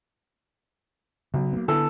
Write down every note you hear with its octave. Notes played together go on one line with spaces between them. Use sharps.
B1 C#3
A#3 B3
D3 B3 E4 A4